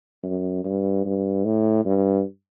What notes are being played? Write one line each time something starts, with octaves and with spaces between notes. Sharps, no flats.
F#2
G2
G2
A2
G2